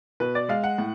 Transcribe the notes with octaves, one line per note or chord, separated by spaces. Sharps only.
B2 B4
D5
G#3 F5
F#5
A2